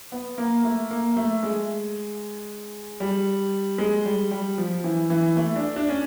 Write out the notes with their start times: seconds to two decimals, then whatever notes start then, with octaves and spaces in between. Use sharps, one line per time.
0.12 B3
0.38 A#3
0.64 A3
0.90 A#3
1.17 A3
1.43 G#3
3.00 G3
3.78 G#3
4.05 G3
4.31 G3
4.58 F3
4.84 E3
5.10 E3
5.36 A3
5.56 D4
5.76 D4
5.89 C#4